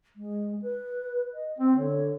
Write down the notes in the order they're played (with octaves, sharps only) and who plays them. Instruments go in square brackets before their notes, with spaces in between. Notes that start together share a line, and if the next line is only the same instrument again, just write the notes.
[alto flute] G#3
B4
D#5
[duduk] C4 [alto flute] G5
[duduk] D3 [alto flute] C#5